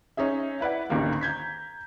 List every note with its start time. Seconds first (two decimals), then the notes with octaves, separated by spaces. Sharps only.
0.17 C#4 D#4 G#4 E5
0.61 E4 B4 D5 F#5
0.90 G#1 C#2 D3 D#3 A#3 G4
1.21 A#5 G6 G#6 B6